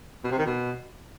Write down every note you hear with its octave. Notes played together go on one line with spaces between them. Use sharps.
B2
C3
D#3
B2